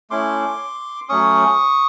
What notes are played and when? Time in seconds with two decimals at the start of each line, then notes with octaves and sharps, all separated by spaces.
0.10 A3 C#4 E4 C6 D6
1.09 F#3 A3 C#4 C#6 D#6